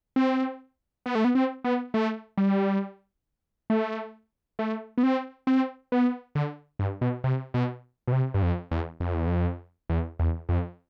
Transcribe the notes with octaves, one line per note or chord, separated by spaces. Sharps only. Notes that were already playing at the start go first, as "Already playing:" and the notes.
C4
B3
A3
B3
C4
B3
A3
G3
A3
A3
B3
C4
C4
B3
D3
G2
B2
C3
B2
B2
C3
G2
F2
E2
F2
E2
F2
E2
E2
F2